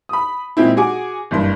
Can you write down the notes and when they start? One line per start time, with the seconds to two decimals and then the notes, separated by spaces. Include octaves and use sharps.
0.09 B5 D#6
0.57 A#2 G#3 C4 E4
0.77 F#4 G#4 G#5 D6
1.31 F#1 G2 C6